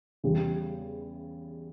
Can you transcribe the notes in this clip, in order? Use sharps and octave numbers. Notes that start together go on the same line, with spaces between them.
E2 C#3 G3